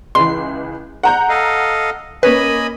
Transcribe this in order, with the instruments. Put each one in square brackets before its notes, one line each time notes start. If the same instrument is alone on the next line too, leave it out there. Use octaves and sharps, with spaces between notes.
[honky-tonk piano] C#2 E3 [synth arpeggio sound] C6
[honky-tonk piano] F#5 A#5 G6
[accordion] A4 D#5 F5
[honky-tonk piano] A#3 C#4 [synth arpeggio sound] B4 [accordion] D#5 G#5 B5